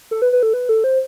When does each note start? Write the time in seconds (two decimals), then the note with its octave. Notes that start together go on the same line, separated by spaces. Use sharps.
0.11 A4
0.22 B4
0.32 B4
0.43 A4
0.53 B4
0.69 A4
0.84 C5